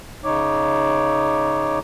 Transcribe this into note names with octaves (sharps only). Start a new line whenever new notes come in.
C#3 D#4 C#5 D6